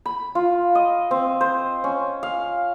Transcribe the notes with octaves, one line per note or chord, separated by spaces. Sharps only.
B5
F4
D#5
C4
C5
C#4
F5